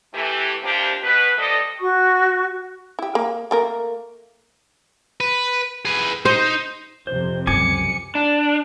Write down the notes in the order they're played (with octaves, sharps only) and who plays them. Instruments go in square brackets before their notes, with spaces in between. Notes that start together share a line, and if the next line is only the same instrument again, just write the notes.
[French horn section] E3 A3 G4
C3 F3 A#3 D4 G4
B2 B4
F3 G3 A3 A4 D5 D#5
[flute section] F#4 C#6
[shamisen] E4 G4
A#3
A3 A#3 A#4
[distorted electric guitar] B4
G#4 B4
[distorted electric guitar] D#4 [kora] C5
[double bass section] F2 C3 [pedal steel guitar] C5
[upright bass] C#2 F#2 [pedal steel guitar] G#5 D6 [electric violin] C#7
[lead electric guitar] D4